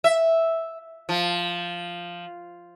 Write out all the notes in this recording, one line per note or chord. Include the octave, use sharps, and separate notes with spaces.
E5
F3